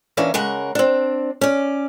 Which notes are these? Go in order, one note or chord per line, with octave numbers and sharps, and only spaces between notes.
E3 A#3 C#4 D4
C#3 G#3 A#4 F#5
C4 D4
C#4 D5